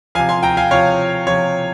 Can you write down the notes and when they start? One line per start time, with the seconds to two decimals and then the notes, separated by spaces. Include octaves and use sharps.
0.15 C3 F3 F5 G#5
0.29 G#5 C6
0.43 G5 A#5
0.57 F5 G#5
0.71 C3 F3 C#5 F5
1.27 C3 F3 C#5